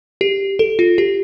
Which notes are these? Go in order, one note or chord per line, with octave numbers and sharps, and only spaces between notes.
G4
A4
F4
G4